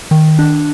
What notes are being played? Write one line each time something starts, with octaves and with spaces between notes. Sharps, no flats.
D#3
D4